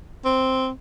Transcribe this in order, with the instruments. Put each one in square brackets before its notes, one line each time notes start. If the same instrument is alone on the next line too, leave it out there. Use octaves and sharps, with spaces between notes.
[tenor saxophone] C4